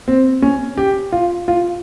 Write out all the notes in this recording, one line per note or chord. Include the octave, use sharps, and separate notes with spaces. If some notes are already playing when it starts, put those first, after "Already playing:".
C4
C#4
G4
F4
F4